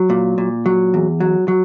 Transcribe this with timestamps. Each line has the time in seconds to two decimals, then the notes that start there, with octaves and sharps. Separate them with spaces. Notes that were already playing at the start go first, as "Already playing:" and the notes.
Already playing: F#3
0.10 A#2
0.38 A#2
0.66 F#3
0.94 E2
1.20 F#3
1.48 F#3